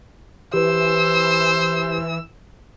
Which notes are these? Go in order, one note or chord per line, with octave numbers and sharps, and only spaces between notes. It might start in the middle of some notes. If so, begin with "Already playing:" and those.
E3 G4 B4 C5 E6